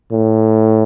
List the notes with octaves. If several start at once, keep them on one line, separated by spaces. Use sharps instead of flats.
A2